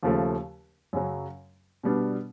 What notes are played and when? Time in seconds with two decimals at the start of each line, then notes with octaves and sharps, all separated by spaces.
0.03 D#2 C#3 F3 A3
0.93 F#2 C#3 F#3
1.83 B2 G3 B3 D4